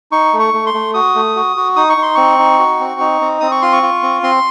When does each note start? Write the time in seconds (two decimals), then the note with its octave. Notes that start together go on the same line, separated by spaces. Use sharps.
0.12 D#4 C#6
0.33 A3
0.40 C#6
0.54 A3
0.66 C6
0.74 A3
0.94 F#4 D#6
1.15 A3
1.36 F#4
1.57 F#4
1.76 D#4 D#6
1.89 C#6
1.97 D#4
2.02 C6
2.15 C4 C#6
2.38 D#4
2.59 F#4
2.80 C4
3.00 D#4
3.21 C4
3.40 C4 D#6
3.51 C#6
3.62 F4 C6
3.73 C#6
3.83 F4
4.03 C4
4.23 C4 C6